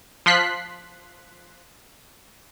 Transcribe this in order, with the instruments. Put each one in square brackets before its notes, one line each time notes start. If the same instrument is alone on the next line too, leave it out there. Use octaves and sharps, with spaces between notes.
[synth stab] F3 C6 F#6 B6 C7